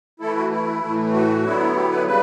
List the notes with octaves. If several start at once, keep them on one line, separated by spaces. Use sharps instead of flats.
E3 A3 E4 A4
F#4
E4
A2 E3 A3
F#4
D3 F#3 B3 E4
G4
B4
C#3 G3 B4